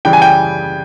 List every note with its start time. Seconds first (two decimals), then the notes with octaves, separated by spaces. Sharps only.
0.05 C#3 E3 G3 G5
0.13 G#5
0.22 G5